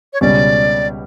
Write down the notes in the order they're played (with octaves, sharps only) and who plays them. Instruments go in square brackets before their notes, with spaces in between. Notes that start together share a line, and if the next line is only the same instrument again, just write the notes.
[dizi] C#5
[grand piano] C#2 B2 G3 C#4 [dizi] D5